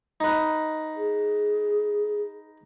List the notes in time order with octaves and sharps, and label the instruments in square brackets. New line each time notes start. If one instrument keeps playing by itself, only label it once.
[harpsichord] D#4 B4
[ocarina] G#4